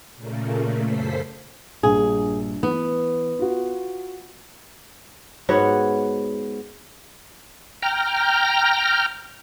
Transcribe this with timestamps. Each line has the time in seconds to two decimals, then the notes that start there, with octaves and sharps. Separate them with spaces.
0.16 A#2 C#3 A3 A#3
0.85 F#2 C#3 A4 C5 C6 B6
1.83 A#1 G2 G#4
2.63 E3 B3
3.39 F4 F#4
5.49 G#2 B3 F#4 C#5
7.82 G5 A#5 F6